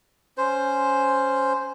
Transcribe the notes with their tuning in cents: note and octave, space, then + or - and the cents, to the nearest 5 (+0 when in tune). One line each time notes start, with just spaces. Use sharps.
C#4 +0 C5 +0